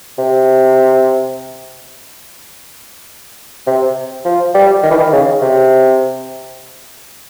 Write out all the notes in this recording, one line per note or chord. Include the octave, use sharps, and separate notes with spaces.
C3
C3
F3
G3
D#3
E3
D#3
C#3
C3